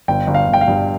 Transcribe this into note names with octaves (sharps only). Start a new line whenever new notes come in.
G1 G5
G1
F5
G1
G5
F5
G2